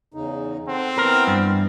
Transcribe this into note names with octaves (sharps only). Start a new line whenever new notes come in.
E2 C#3 D#4
C4 A4 F#5
E3 B3 A#4
G2